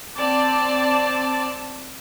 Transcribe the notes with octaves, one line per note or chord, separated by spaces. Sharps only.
C4 D5 A5